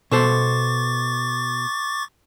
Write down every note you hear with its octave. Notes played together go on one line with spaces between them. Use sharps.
B2 A4 C5 C#6 D6 A6